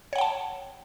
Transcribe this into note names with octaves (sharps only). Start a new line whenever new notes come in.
C#5 F#5 G5 A5